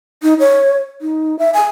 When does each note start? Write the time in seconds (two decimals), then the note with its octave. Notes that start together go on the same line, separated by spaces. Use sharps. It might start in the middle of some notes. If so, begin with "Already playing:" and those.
0.23 D#4
0.40 C#5
1.02 D#4
1.39 E5
1.54 G#5